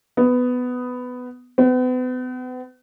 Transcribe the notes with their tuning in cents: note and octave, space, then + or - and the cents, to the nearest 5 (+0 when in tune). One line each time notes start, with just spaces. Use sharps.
B3 +10
B3 +40